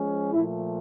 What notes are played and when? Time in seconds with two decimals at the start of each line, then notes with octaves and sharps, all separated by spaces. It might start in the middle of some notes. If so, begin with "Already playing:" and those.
Already playing: F3 G#3 C#4
0.33 A#2 F3 A3 E4